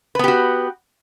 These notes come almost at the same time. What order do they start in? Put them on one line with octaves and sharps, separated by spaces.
B4 B3 G4 F#4